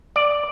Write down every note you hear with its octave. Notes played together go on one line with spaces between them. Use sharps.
D5